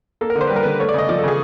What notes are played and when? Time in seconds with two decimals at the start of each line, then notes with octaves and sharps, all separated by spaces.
0.21 A#3 A4
0.30 A#4
0.35 D3
0.41 C5
0.47 G3 B4
0.56 A#4
0.63 D3 B4
0.79 A3 C#5
0.89 D5
0.94 C#3 D#5
1.09 F3 D5
1.18 A4
1.24 C#3 G#4